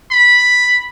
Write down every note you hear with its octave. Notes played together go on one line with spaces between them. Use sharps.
B5